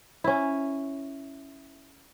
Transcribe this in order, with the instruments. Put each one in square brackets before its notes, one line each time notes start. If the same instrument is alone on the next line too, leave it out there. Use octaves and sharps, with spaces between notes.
[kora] C#4 E4